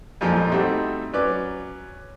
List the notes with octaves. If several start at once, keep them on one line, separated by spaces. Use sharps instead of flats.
F2 A#2 F3 G#3
G3 A3 C4 D#4 F#4
F#3 C#4 B4 D5